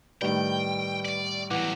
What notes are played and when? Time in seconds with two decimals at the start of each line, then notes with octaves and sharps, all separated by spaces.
0.22 A2 D#3 G3 B4 G5
1.05 D5
1.51 B1 E3 F#3 F#5 D6